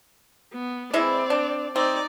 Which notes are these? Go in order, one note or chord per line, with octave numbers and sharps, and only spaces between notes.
B3
E3 G#3 C4 E4 D5
D4
C4 D#4 D5